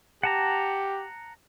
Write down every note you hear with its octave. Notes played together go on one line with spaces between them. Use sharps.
G4 F#5 A5 A#5